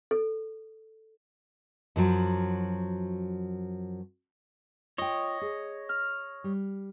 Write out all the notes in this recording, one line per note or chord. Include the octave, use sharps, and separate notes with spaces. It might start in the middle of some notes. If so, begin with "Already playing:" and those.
A4
F#2 F3 F#3
F4 C#5 D#5 G5
G#4
F6
G3